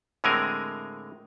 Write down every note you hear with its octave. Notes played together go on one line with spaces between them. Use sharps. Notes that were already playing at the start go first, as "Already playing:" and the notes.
A2 D3 G#3 C4 A#4 G#5